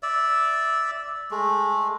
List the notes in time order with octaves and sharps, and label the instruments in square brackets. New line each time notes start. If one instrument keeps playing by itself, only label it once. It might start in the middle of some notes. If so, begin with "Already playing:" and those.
[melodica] D5 E5
G#3 A3